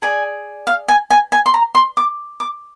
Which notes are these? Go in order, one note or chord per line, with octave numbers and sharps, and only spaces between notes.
G#4 D5 G#5
F5
G#5
G#5
G#5
C6
A#5
C6
D6
D6